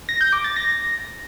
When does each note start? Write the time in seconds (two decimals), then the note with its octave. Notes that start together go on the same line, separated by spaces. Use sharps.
0.09 A#6
0.21 G6
0.33 D6
0.44 A6
0.56 A#6